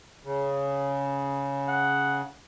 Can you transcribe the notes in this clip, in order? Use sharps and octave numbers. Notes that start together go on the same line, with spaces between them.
C#3
F#5